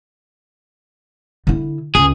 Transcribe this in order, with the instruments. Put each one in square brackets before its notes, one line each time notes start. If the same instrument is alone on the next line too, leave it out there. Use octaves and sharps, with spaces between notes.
[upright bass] D3 E4
[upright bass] C#2 [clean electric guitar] G#4